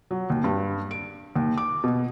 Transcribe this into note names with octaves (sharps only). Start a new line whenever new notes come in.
F#3
D#2
G2
D7
D#2
D6
B2